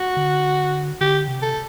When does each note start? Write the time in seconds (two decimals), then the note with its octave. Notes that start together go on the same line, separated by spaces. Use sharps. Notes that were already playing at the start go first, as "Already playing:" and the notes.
Already playing: F#4
0.17 D3
1.01 D3 G4
1.28 C3
1.42 A4